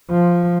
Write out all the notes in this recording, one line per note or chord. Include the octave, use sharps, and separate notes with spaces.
F3